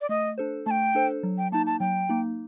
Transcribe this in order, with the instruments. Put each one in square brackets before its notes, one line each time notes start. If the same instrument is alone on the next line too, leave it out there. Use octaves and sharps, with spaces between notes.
[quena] D5
[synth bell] A3 [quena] D#5
[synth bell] D4 A4 C5
[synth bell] A3 [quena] A5
[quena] G5
[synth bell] D4 A4 C5
F#3
[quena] G5
[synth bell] A#3 D#4 [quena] A5
[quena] A5
[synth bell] F#3 [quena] G5
[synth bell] A#3 D#4